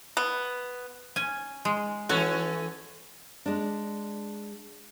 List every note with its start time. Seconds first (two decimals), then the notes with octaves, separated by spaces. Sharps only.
0.17 B3
1.16 C#4 G#5
1.65 G#3
2.09 E3 C#4 F#4 A4
3.46 G#3 D4